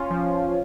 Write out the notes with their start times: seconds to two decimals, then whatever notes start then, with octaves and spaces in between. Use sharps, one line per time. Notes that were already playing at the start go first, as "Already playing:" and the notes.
Already playing: C#4 F4
0.10 F3